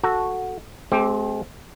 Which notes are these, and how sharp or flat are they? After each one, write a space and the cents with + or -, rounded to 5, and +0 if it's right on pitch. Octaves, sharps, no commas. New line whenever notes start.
F#4 -5 A4 +0
G#3 +45 C4 +0 G4 +0